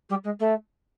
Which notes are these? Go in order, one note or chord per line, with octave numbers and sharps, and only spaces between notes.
G3
G#3
A3